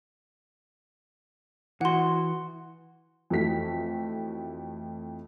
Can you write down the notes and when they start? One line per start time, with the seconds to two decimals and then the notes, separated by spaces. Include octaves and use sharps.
1.81 E3 F#4 F#5 C6
3.30 F2 E3 A3 F#4 B6